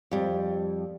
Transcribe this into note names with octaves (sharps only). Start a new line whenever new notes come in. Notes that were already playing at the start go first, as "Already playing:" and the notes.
F2 G3